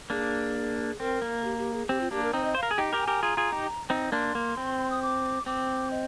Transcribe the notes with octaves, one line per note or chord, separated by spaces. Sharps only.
A#3 D4 G#4
C4 A#4
A#3
G4
G4
G#4
C4 G4
F4
A#3 D4 G4
A#4
C4 D#4 C5
D#5
C5 F5
A#4
G#4
D#4 G4 G5
G4 A#4
G#5
G4 A#4
F4 G#4 A#5
F4 G#4
D#4 G4
C4 D#4
A#3 D4 C6
A#3
C4
D#6
D6
C4 D6
D#5